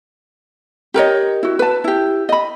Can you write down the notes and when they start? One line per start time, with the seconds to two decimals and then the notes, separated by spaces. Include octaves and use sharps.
0.94 G4 A#4 C#5 D#5
1.43 E4 F#4
1.59 B4 A5
1.84 E4 G4
2.29 D#5 B5